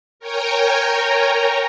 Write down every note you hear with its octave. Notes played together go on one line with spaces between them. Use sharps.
A#4 C#5 G5 G#5 A#5